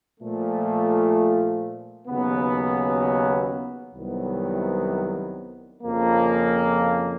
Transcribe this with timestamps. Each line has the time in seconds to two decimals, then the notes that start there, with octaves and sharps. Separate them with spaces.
0.20 A#2 F3 A3
2.07 D#2 C#3 F#3 B3
3.95 C2 C3 D#3 F#3 B3
5.82 F2 C#3 F3 A#3